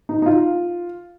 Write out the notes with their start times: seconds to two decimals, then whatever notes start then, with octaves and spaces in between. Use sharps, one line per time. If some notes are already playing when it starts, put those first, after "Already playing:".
0.09 D#4
0.22 D#4
0.26 F4